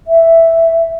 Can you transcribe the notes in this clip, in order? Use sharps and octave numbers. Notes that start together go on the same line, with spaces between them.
E5